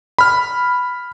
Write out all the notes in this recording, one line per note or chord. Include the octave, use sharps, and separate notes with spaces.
B5 F6